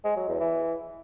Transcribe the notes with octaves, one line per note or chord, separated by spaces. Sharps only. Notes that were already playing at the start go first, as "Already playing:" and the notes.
G#3
F#3
E2
E3